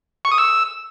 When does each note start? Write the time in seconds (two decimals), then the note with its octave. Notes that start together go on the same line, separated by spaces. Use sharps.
0.25 C#6
0.32 D#6
0.38 E6